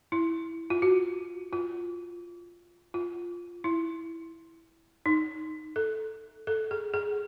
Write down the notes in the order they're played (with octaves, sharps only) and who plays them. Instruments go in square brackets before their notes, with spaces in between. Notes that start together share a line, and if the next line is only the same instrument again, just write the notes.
[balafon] E4
F4
F#4
F4
F4
E4
D#4
A4
A4
G#4
G#4